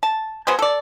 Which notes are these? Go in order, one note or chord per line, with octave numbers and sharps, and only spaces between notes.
A5
F#3 B3 G#4 C5
A4 D5